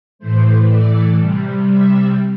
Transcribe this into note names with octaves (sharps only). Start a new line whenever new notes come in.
A2 E3 A3 C5
D5
C3 G3
E5